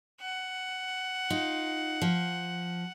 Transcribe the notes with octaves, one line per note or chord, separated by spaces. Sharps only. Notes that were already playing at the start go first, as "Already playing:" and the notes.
F#5
D#4 F4
F3